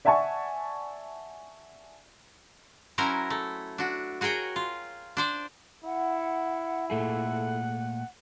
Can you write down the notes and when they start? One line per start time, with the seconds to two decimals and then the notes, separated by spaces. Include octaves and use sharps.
0.05 D5 E5 F#5 G#5 A5 C#6
2.98 F#3 C#4 E4 A#4 C5 A#5
3.30 A3
3.78 D4 F#4
4.21 F#4 G#4 A#4 C#5 G5
4.56 F4
5.17 D4 C5 D5
5.84 E4 F#5
6.90 A#2 A3 G#4 A4 F#5